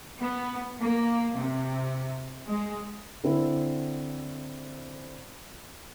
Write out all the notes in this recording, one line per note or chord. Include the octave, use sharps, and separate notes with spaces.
B3
A#3
C3
G#3
D3 C4 E4